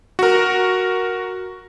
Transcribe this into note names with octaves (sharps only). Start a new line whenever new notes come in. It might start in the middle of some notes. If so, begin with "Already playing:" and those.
F#4 A#4